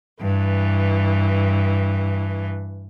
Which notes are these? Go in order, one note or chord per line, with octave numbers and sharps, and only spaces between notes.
G2 E3